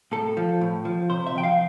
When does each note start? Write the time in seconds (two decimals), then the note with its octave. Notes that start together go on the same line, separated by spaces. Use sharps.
0.12 A2 A4
0.37 F3
0.61 A2
0.85 F3
1.10 C3 C5
1.27 E5
1.35 F3 G5
1.43 F5